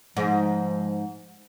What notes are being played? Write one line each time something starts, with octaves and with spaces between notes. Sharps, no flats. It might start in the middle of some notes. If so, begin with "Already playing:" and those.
G#2 F3